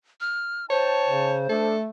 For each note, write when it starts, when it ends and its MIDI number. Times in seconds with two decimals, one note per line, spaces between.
0.21 0.66 89
0.70 1.37 63
0.70 1.67 72
0.70 1.36 73
0.70 1.37 79
0.70 1.37 81
1.07 1.44 49
1.49 1.89 57
1.49 1.76 62
1.49 1.81 69